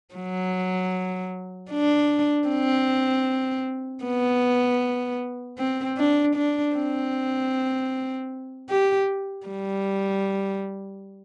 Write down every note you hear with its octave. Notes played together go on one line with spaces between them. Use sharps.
F#3
D4
C4
B3
C4
D4
D4
C4
G4
G3